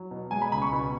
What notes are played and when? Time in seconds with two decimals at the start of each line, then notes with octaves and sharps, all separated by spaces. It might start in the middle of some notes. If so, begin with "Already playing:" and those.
Already playing: F#3
0.11 B2
0.31 G#3 G#5
0.42 B5
0.52 C#2 B5
0.62 C#6
0.73 B2